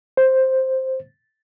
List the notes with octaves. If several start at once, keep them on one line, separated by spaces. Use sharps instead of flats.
C5